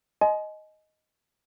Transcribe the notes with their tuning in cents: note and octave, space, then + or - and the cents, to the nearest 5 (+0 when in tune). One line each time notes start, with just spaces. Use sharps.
D#5 +0 G#5 +35 C6 -20